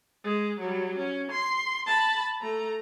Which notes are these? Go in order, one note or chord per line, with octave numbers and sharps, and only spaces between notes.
G#3
F#3 G3
C#4
C6
A5 B5
A3 A#5